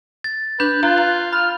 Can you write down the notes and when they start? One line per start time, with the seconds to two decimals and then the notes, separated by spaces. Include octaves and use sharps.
0.24 A6
0.60 D4 B4 G6
0.83 F4 A#5 F#6
0.98 A#5
1.33 B5 F6